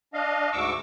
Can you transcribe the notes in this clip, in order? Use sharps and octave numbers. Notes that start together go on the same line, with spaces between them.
D4 D#5 F5
D2 G#2 C#6 D6 E6